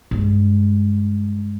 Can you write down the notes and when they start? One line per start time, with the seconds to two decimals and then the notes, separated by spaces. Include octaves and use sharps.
0.11 G2 G#3